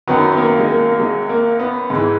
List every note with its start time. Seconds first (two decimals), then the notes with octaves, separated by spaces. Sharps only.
0.07 F#2 D#3 F#3 B3
0.32 B3
0.38 A#3
0.59 G#3
0.68 A#3
0.91 A#3
1.00 G#3
1.29 A#3
1.59 B3
1.90 G#2
1.95 E3